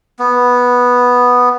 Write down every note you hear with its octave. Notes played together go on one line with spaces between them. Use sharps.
B3